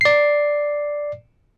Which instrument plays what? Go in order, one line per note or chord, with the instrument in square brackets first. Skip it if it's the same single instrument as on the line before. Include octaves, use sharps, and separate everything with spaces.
[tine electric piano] D5 C7